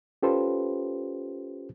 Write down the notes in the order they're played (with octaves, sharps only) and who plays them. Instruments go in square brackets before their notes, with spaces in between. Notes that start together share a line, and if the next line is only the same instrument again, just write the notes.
[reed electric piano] C#4 F4 G4 A4 B4 C5